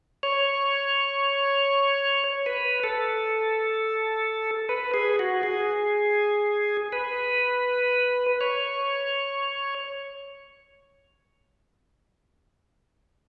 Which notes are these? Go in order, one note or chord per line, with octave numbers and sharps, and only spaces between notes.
C#5
B4
A4
B4
G#4
F#4
G#4
B4
C#5